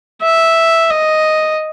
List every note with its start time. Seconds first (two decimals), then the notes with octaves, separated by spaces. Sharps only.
0.22 E5
0.90 D#5